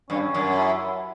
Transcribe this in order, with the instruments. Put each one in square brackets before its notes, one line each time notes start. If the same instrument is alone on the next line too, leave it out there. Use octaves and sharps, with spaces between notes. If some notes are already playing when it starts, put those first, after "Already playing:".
[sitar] G2 [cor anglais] C#4
[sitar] F#2
[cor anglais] E4